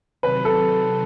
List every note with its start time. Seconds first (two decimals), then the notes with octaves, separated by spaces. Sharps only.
0.22 C3 D#3 F#3 C4 B4
0.45 A4